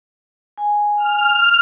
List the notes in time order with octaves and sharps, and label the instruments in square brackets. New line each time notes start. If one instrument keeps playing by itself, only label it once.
[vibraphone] G#5
[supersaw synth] F6